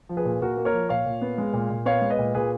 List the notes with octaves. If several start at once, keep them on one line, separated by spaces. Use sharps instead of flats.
F3
G#4 B4
A#2
A#2 F#4 A#4
A#3
A#4 C#5
F3
A#2 C#5 F5
A#2
B3
G#3
A#2
A#2
B3 C#5 F5
G#3
B4 D#5
A#2
A#2 G#4 B4